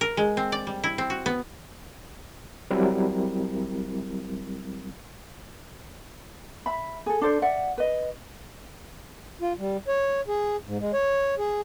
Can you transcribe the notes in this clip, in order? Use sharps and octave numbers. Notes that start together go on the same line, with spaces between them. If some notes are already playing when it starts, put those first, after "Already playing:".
A#4
G#3
C4
D5
G3
E4
C4
F#4
B3
F#3 G3 C4 E4 A#4
E5 B5
G#4 A4
D4 A4 C5 D5
D5 E5 F#5
B4 D#5
F4
G3
C#5
G#4
G#2
G#3
C#5
G#4